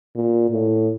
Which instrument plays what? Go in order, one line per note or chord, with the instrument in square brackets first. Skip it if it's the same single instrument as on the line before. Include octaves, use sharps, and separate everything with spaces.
[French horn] A#2
A2